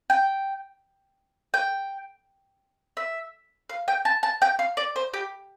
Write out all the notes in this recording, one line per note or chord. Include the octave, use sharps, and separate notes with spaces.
G5
G5
E5
F5
G5
A5
A5
G5
F5
D5
C5
G4